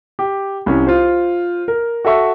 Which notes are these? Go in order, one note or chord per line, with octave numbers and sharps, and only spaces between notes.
G4
C2 C#4
F4 C5
A#4
F#4 A4 E5 C#6